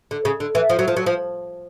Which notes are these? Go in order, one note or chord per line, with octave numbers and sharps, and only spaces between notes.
D3
C#3
D3
E3
F3
F#3
F3
F#3
F3